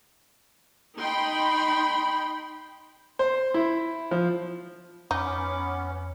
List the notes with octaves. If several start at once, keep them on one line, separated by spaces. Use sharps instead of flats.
D#4 G5 B5 C6
C5
E4
F3
F2 B3 C#4 D#4 F#5 B5 D6